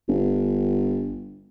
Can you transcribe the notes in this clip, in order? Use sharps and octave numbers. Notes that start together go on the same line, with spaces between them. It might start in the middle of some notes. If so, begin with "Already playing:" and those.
G1